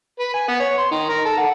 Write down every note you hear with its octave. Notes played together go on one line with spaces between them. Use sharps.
B4
G#5
B3
C#5
C6
D#3
A#4
A4
F#5